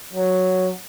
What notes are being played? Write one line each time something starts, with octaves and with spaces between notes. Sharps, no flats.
F#3